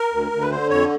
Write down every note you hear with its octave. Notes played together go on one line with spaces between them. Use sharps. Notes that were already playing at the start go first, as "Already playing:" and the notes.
Already playing: A#4
D2
D2
B4
D3 C5
F2 C#5